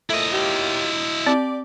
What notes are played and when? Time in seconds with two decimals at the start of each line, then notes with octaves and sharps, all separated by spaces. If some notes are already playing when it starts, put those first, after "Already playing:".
0.10 A#2 F3 A3 E4 D#5
0.33 D#2 F4 G4
1.26 C4 G4 D5